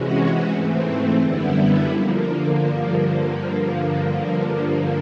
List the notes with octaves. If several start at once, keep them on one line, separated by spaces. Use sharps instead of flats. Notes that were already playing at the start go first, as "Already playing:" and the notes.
Already playing: C3 E3 G#3 C#4 F#4
G#2 E3 A3 C4
F#2 D3 G3 B3 E4
D3 F3 A#3
G2 D3 F3 A#3